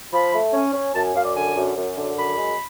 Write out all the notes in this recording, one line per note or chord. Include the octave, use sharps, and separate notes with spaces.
F3 B5
A3
C#4
C#4
F#2 A5
G#5
F#2 F5
D5
D3 G#5
F#2
F#2
D3
F#2 B5
G#3